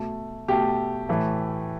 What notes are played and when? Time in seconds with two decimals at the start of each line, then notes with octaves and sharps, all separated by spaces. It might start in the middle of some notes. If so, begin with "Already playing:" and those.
Already playing: B2 A3
0.48 B2 A3 G4
1.09 A2 E3 A3